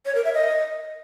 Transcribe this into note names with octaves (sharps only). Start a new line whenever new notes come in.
C#5
A#4
E5
D#5